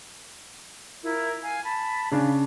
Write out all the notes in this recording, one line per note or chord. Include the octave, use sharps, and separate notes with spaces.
E4 F4 A#4
F5 G#5
A5 B5
C#3 D4 F5 G#5